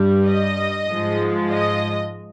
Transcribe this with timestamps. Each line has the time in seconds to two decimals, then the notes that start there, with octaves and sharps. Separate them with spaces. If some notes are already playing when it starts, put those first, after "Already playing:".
Already playing: G2 G3
0.28 D#5
0.89 G#2 F3 G#3
1.51 D#5